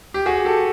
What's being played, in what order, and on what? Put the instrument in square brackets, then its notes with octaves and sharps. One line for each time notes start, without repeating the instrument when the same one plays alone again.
[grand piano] G4
F#4 G#4
G4 A4